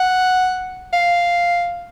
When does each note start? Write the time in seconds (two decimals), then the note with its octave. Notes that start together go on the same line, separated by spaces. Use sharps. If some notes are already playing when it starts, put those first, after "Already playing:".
Already playing: F#5
0.93 F5